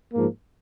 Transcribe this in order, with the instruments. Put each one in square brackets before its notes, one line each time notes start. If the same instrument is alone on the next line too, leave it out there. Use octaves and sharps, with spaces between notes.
[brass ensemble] G#2 F3 A#3